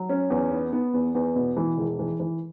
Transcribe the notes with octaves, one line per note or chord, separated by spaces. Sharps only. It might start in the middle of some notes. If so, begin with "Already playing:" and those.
Already playing: F#3
C#4
E2
B3
B3
E2
E2
B2
E3
E1
E3
E3